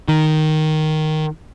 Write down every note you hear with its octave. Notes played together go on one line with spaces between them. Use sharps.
D#3